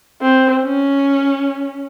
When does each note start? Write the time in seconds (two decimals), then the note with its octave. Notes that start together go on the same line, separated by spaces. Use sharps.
0.21 C4
0.63 C#4